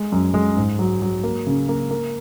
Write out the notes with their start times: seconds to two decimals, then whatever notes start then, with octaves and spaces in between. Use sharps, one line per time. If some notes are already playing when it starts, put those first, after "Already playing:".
Already playing: G#3
0.12 F#2
0.34 G#3
0.57 G#2
0.79 F#3
1.02 F#3
1.23 A#3
1.47 C#3
1.69 A#3
1.91 A#3